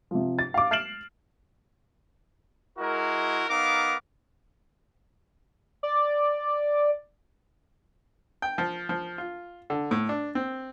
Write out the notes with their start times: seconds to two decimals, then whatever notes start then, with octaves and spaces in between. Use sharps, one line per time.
0.11 C3 F3
0.39 A6
0.54 F5 D6
0.71 F6 A6 C7 D7 E7 F#7
2.79 G#3 E4 F#4 A#4
3.49 B3 D#4 A#4 F5 D6
5.83 D5
8.42 G5
8.58 F3
8.89 F3
9.18 F4
9.70 D3
9.91 A2
10.09 D4
10.35 C4